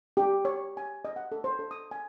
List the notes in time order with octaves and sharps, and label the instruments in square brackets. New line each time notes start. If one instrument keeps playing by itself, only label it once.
[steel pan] G4
C#5
G#5
D#5
F#5
A4
C5
A4
D#6
G#5